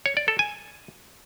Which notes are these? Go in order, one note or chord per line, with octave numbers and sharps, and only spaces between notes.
C#5
D5
A4
G#5